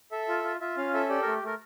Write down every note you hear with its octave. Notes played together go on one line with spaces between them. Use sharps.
A4 E5
F4
F4
F4 E5
C#4 F5
A4 E5
G4 D5
A3 A#4
A3 A#4